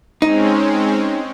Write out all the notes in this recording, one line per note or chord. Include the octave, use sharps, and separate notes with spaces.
G#3 C4 C#4 D#4